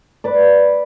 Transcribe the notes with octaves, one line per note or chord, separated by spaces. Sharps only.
B4 D5